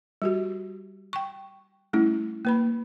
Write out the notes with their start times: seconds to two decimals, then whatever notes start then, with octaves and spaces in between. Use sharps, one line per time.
0.22 G3 F#4 G4
1.13 G5 C#6
1.93 G3 A3 C#4 E4
2.45 A#3 B4 B5